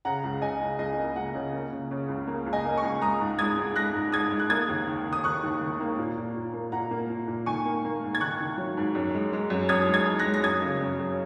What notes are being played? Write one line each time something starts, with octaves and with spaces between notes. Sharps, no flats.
C#3 F#5 A#5
C#2
C#2 D#5 G#5
C#2
C#2 D#5 G#5
A#3
C#2 F#5
C#3
A#3
C#3
C#3
C#2
A#3
C#2
D#5 G#5
A#3
G#5 C#6
C#2
G#3 A#5 D#6
G#2
G#3 D#6 G#6
G#2
G#3 F#6 A#6
G#2
G#2 D#6 G#6
G#3
F#6
A#3 D#6 G#6
D#2
D#3
D#3
D#6
D#3 C#6 F#6
D#2
D#3
A#3
A#2
A#2
A#2
A#3
A#2 F#5 A#5
A#3
A#2
A#2
D#3 G#5 C#6
A#3
A#3
G#2
G#6
D#3 C#6 F#6
D#3
F#3
G#2
F#2
G#3
G#3
F#2
F#2 D#6 G#6
G#3
D#6 G#6
G#3
F#6 A#6
G#3
A#6
F#2 D#6 G#6
C#3
F#2
F#2